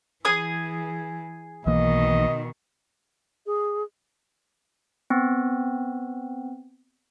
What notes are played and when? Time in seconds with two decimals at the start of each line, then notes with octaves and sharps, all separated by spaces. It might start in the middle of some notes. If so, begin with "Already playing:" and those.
0.25 E3 G#4 G#5 D#6
1.66 B1 B2 D#3 E3 A#3 D#5
3.46 G#4
5.10 B3 C4